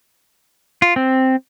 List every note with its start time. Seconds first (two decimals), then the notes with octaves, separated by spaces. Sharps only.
0.82 F4
0.96 C4